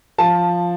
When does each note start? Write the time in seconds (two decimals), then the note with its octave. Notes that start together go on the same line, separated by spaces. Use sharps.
0.18 F3 A5